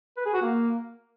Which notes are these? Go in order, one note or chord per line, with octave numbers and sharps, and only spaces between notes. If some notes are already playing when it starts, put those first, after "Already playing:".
B4
G#4
F#4
A#3